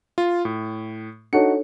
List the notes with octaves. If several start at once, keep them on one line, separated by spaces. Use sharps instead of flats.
F4
A2
D4 D#4 F#4 A4 C#5 A5 C#7